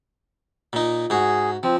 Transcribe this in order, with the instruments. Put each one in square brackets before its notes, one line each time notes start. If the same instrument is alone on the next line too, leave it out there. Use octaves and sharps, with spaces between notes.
[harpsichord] A#2 D#4
[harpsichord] G#2 F#4 [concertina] G#4
[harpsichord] F3 [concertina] C4